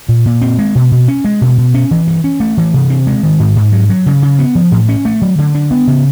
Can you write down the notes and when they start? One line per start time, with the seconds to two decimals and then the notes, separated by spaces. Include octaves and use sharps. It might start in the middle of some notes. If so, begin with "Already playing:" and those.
0.09 A#2
0.26 A#2
0.42 C4
0.58 G#3
0.75 B2
0.91 B2
1.08 C#4
1.25 G#3
1.41 B2
1.58 B2
1.74 C#4
1.91 E3
2.07 G2
2.24 C#4
2.40 A3
2.57 E3
2.74 C3
2.90 C4
3.07 G#3
3.23 D#3
3.40 G#2
3.56 G#2
3.72 F#3
3.89 F#3
4.06 C#3
4.22 C#3
4.39 B3
4.55 F3
4.72 A2
4.89 C#4
5.05 A3
5.21 F#3
5.38 D3
5.55 D4
5.71 B3
5.87 C#3